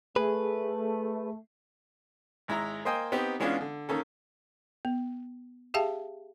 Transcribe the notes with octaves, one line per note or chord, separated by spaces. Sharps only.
A3 G#4 B4
G#1 G#3 E4 A#5
A#3 C5 D#5 G5 G#5
B3 C4 D#4 G4
E3 G#3 B3 C#4 D4 F4
D3
D#3 A#3 C#4 A4
B3
G4 G#4 E5 F5 G5 A5